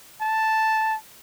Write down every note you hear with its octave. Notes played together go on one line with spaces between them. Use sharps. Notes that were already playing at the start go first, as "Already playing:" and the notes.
A5